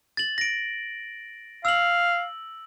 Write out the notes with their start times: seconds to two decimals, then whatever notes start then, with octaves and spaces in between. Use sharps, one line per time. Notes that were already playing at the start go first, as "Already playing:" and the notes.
0.17 A6 F#7
0.38 A#6 D7
1.65 F5 E6 F#7